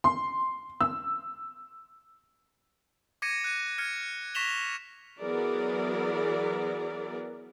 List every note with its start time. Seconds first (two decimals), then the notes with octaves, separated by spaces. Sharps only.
0.04 C6
0.81 E6
3.22 D6 G#6 A#6 C#7 D#7
3.44 F#6 D#7
3.78 F6 G#6 C#7
4.35 C#6 A#6 B6 E7 F7 G7
5.22 E3 F#3 B3 G#4 A#4 D5